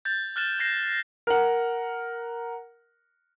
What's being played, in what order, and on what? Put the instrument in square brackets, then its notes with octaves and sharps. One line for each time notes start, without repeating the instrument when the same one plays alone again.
[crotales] G6 A6
F6 F#6 A6 E7
G6 A#6 C7 E7
[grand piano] A#4 F#5